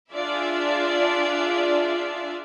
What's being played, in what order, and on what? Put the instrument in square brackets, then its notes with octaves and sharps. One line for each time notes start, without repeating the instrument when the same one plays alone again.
[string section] D4 F4 G#4 D5 E5